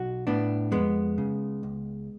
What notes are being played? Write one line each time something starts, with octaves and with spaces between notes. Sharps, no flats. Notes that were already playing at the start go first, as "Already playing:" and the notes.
Already playing: B1 F#4
A2 B3 D4
F2 G#3 B3
C#3
C#2